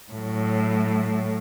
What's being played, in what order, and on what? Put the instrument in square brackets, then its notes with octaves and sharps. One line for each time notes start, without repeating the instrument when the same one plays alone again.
[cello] A2 F#3